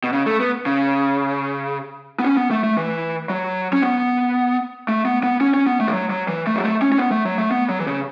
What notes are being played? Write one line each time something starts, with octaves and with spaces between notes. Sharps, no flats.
B2
C#3
A3
B3
C#3
B3
C#4
B3
A3
A3
E3
F#3
C#4
B3
A3
B3
B3
C#4
C#4
B3
A3
E3
F#3
F#3
E3
A3
F#3
A3
C#4
C#4
B3
A3
F#3
A3
B3
F#3
E3
C#3